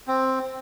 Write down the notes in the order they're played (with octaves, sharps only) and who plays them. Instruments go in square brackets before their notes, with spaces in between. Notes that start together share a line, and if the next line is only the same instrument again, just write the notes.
[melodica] C4